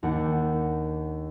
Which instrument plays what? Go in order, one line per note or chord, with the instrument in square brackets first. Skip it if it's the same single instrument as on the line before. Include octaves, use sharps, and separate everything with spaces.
[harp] D#2 D4 F#5 G5